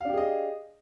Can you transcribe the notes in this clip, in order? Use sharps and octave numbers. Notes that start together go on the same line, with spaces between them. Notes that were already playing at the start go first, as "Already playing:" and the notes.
D4 G4 G#4 D#5 F5